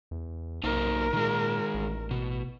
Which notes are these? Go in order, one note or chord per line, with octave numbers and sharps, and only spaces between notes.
E2
B1 A#3 D#4 A#4 C5
A#2 D#3 G#3
A1
B2